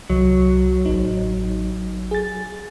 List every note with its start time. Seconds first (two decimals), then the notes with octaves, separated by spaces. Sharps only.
0.10 C2 F#3
0.86 A1 D#4
2.11 G#4 A6